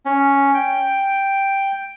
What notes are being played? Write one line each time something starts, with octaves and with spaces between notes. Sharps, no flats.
C#4
G5